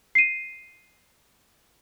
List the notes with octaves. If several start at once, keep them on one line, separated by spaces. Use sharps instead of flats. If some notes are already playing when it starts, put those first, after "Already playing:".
C7 D#7